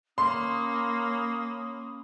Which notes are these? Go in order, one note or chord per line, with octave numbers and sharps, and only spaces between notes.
A#3 C#4 B5 C6 D#6